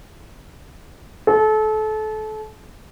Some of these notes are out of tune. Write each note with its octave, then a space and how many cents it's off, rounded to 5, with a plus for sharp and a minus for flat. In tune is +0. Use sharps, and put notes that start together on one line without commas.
A4 -30